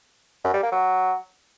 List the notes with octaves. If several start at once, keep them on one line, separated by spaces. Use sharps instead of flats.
F#2
G3
A#3
F#3